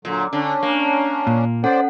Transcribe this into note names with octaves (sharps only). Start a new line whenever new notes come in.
A#2 D3 F#3
D3 C#4 D4
A#3
A#2
C#4 A4 C5 D5 F#5